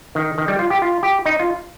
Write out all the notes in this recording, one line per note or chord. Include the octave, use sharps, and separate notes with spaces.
D#3
D#3
G3
F4
G4
F4
G4
D#4
F4